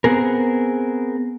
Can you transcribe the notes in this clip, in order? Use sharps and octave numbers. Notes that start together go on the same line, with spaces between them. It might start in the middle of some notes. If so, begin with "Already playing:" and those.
B3 C4 G#4 A#4